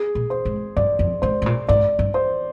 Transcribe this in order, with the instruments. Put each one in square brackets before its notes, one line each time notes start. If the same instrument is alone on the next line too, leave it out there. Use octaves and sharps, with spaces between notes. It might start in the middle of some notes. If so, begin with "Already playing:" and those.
Already playing: [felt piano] G#4
[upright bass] A#2
[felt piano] C5
[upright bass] G#2
[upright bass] G2 [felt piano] D5
[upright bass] F2
[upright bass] G#2 [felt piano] C5
[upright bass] G#2
A#2
[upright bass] G#2 [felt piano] D5
[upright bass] G2
[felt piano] C5